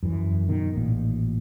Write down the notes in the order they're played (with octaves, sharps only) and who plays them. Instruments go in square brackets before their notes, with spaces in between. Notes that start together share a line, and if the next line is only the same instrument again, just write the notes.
[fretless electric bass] F#2 E3
B2 D#3
A1 A#2